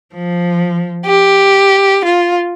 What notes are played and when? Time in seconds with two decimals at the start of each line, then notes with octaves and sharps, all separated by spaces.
0.13 F3
1.06 G4
2.05 F4